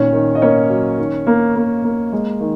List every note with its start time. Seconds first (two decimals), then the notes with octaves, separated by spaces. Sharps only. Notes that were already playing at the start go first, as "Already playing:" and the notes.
Already playing: A#2 D#3 C#4 C#5
0.13 D#3
0.35 D#5
0.42 A#3 C#4 C#5
0.70 F#3
0.98 D#3
1.27 A#3
1.56 A#3
1.84 A#3
2.13 G#3
2.40 D#3